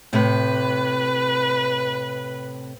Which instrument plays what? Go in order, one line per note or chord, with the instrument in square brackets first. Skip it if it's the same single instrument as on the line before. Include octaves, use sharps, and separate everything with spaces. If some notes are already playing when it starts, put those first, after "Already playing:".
[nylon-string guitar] A2 C3 [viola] B4